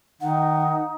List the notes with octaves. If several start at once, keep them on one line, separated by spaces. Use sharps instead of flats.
D#3 D#4 F#5